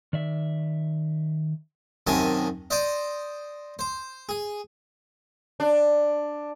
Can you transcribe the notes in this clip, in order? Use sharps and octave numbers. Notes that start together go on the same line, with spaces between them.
D#3 D5 E5
F#2 C3 D#3 D#5 G#5 A5
C5 D5 D#5
C5
G#4
D4